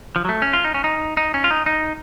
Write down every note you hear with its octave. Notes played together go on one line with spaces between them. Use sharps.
F3
F#3
A3
C#4
F4
D#4
C#4
D#4
D#4
C#4
F4
D#4
D#4